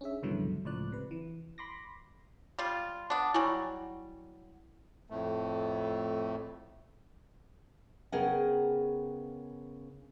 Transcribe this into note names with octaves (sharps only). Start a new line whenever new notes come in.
C#4 D4 G#4 E5
C#2 G2 B2 D3 E3 F#3
C#2 A2 F3 D5 F#6
C3 B4
E3
B5 C6 D6 A#6
G3 F4
B3 D4
F#3 G3 E4 F#4 G#5
F2 A2 A3
C#3 B3 G#4 A#4 F#5 G5